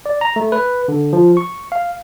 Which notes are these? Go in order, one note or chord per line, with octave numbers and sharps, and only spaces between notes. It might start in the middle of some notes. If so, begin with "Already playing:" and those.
D5
A#5
A3
B4
D3
F3
C#6
F5